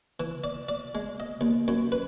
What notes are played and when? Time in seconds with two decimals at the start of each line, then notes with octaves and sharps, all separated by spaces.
0.20 E3
0.44 D5
0.69 D5
0.95 G#3
1.20 D#5
1.41 D#2
1.68 F#2
1.92 B4